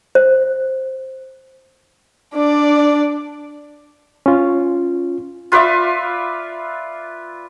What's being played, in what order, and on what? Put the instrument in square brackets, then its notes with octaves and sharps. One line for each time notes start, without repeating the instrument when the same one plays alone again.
[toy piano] C5
[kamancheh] D4 D5
[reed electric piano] C#4 F4
[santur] F4 B4 D5 E5